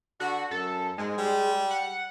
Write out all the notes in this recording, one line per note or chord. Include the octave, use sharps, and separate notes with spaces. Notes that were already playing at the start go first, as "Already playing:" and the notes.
D3 F#4
F#2 A4
G#2 G#3
G3
F#5